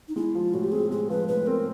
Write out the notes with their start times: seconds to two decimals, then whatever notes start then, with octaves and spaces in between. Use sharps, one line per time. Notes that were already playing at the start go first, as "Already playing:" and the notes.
0.08 D#4
0.16 G#3 E4
0.35 F3 F4
0.53 A2 F#4
0.64 G4
0.72 C4 G#4
0.91 G#3 G#4
1.10 F3 B4
1.28 A2 B4
1.47 C4 A#4